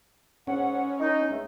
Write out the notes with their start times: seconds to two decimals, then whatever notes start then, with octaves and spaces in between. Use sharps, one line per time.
0.47 G#2 C#4 F#5
1.00 D#4
1.30 C#2 A3